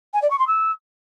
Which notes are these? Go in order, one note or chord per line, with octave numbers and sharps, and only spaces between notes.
G#5
D5
C#6
C6
E6